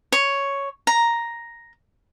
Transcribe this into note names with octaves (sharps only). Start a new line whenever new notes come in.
C#5
A#5